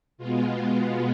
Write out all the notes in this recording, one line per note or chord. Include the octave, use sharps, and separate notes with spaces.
B2 G#3 B3 F4